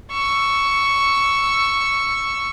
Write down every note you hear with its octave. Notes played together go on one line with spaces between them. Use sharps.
C#6 E6